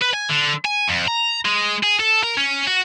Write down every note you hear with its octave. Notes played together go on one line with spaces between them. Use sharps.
B4
G#5
D3
G#5
F2
A#5
G#3
G#4
A4
A#4
C#4
F#4